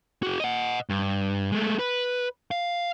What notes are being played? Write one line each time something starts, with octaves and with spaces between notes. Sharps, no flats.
F#4 G#4
D#5 F#5
G2
G#3 A3
B4
F5